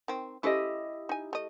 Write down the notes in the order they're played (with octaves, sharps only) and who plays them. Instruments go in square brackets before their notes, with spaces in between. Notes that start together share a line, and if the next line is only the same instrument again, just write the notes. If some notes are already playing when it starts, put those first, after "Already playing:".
[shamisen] D#3 C4
[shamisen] C#4 A4 C5 [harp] E4 G4 D#5
[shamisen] D#4 G#5
A3 D#5